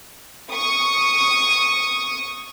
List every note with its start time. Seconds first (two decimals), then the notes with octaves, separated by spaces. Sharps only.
0.51 C#6 D#6